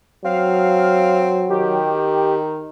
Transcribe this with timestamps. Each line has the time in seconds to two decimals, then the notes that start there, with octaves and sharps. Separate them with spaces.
0.25 F#3 C4 F5
1.49 D#3 G4